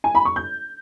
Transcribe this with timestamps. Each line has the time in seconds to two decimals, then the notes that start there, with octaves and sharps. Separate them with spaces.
0.04 G#5
0.15 B5
0.25 C#6
0.36 G6